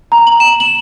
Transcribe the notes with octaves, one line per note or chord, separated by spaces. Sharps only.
A#5
F#7
E7
F#7